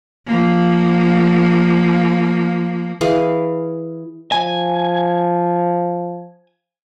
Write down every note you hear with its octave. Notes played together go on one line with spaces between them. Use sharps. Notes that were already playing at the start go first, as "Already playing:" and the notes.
F3 A#3
E3 G#4 F5
F3 G#5